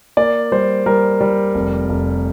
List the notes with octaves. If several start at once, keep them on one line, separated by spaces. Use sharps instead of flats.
A#3 D5
G3 C5
G3 A#4
G3
F1
F1